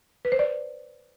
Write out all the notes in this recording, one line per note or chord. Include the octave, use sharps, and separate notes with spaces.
B4
C5
D5